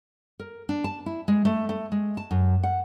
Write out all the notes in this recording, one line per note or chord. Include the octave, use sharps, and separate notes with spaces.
A#4
D4
A5
E4
G#3
A3
A3
G#3
A5
F#2
F#5